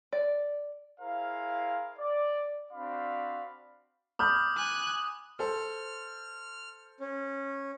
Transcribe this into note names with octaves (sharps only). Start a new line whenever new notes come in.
D5
E4 G#4 A#4 C5 F5
D5
C4 D4 F#4 D5 F5 B5
B5 D6 D#6 F6 G6
G#5 F#6
A4 C5 F6
C#4